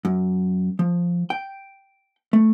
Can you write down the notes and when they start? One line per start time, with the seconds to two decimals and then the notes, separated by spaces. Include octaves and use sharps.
0.05 F#2
0.79 F3
1.30 G5
2.33 A3